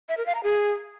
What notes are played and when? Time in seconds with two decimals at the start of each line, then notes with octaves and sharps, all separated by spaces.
0.09 E5
0.17 A#4
0.26 F5
0.35 A#5
0.43 G#4